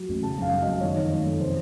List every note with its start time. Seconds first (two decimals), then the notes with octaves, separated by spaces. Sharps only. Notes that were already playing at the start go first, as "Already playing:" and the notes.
Already playing: F#3
0.09 A1
0.23 C#3 A5
0.38 F#2 F5
0.52 F#3
0.63 F#2 D#5
0.81 D#3 C#5
0.96 F2
1.11 A3
1.26 F2
1.40 C3 C5